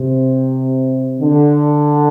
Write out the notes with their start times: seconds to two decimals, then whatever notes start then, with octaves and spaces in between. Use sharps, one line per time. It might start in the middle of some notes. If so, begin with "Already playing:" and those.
Already playing: C3
1.20 D3